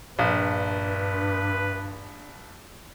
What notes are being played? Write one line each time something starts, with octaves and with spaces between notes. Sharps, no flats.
A#1 G2 D4 B4 F5